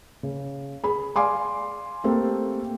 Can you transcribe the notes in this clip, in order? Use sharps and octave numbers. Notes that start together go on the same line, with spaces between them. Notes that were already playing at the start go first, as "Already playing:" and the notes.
C#3
G#4 B5
D5 F5 G#5 C6 D6
A3 A#3 C4 G4 A4